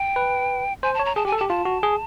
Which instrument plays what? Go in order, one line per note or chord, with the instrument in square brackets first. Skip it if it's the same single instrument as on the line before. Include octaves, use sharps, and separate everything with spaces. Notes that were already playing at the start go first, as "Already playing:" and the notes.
Already playing: [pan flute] G5
[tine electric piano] B4
[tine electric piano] C5 [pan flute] G#5
[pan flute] A5
[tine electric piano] C#5
[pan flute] A#5
[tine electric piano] G#4 [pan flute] A5
[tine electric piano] G4 [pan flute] G#5
[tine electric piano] A4
[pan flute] A5
[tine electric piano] G4
[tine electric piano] F4 [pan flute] A5
[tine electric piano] F#4
G#4